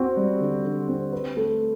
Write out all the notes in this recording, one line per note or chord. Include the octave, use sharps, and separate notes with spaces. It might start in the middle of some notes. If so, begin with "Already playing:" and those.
Already playing: C4 F#4
G3
D3
D3
C4
B4
A3